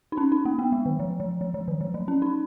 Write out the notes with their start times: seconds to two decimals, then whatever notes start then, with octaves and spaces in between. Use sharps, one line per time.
0.12 D#4
0.17 C#4
0.32 D#4
0.45 A#3
0.59 B3
0.72 G#3
0.86 D#3
1.00 F3
1.20 F3
1.41 F3
1.54 F3
1.68 D#3
1.81 F3
1.94 F#3
2.08 C#4
2.22 D#4